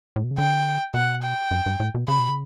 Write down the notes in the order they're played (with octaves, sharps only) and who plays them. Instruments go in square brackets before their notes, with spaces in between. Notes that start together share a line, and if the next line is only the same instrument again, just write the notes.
[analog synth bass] A2
B2
C#3
[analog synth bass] D3 [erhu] G5
[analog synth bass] B2 [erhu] F#5
[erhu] G5
[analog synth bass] F#2
G2
A2
B2
[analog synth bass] C#3 [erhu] B5
[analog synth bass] B2
C#3